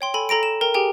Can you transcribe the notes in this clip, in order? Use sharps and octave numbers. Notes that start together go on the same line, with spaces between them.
C#5 G5 C6
A4 G#5 B5
A4 A#5 A#6 D7
E7
A#4 G5 A#5 G7
G4 G#4 G5 G#5